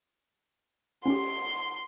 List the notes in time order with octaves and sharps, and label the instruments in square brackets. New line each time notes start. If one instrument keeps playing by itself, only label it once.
[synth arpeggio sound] C#4 G4 [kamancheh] C6